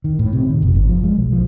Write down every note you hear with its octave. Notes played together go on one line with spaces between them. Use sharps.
D#3
A2
C3
D#3
F#1
G#1
F3
G#3
B1
F3